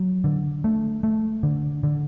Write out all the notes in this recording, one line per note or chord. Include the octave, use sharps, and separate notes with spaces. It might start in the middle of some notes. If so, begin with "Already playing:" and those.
Already playing: F#3
D3
A3
A3
D3
D3